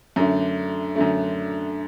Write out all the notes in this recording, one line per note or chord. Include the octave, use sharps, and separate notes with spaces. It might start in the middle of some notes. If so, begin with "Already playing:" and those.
F#2 D3 A3
F#2 D3 A3